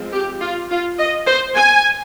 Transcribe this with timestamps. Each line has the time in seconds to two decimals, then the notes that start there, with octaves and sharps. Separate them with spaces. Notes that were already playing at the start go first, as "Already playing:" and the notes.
Already playing: F3 G#3 C4
0.12 G4
0.41 F4
0.70 F4
0.98 D#5
1.27 C5
1.55 G#5